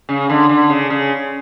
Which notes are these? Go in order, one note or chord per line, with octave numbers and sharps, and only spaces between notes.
C#3
D3
D3
C#3
C#3